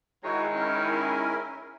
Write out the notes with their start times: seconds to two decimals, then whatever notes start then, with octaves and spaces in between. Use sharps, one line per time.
0.24 D#3 G#3 E4 F#4 C#5
0.55 C#4 E4 A#4